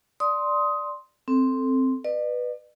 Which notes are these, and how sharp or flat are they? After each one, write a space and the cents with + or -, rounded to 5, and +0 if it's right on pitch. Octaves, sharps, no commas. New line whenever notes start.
D5 +0 C6 +0 D#6 +15
C4 +0 A4 +0
B4 +0 D5 +45